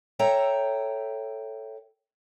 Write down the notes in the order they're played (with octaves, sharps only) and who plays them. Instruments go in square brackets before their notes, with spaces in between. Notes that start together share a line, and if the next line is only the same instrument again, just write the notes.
[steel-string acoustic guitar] A4 C#5 E5 G5 A#5